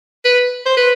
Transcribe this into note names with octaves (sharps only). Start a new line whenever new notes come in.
B4
C5
B4